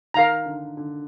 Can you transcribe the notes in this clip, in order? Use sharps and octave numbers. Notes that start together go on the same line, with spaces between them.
D#3 A#4 F5 A#5
D3
D3